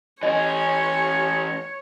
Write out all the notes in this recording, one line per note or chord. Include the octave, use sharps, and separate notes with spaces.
E3 C#4 C#5 D#5 G#5 B5